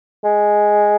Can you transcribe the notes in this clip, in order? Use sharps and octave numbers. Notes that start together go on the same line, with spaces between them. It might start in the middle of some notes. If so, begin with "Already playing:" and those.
G#3